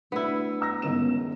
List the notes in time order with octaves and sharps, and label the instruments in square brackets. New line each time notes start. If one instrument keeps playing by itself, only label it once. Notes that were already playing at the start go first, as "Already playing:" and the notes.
[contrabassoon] D2 [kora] B3 E4
[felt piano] A#5 E6 A#6
[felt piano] G1 D#3 E7 [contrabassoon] C#2